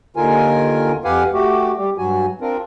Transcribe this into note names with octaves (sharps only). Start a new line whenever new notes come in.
D#2 D3 D#3 F4 A#4 G#5
F2 G4 B4 F5 F#5 G#5
A3 F#4 G4
G3 G4
G2 F#3 F#4 G#5
C4 D4 F4 A#4